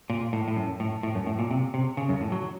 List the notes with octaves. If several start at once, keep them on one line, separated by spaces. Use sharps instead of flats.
A#2
A2
A2
F#2
A2
A2
F#2
A2
A#2
C3
C3
C#3
F#2
A2
F#3